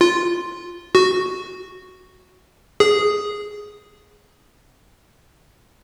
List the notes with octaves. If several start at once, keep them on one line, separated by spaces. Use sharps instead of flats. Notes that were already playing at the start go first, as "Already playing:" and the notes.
F4
F#4
G#4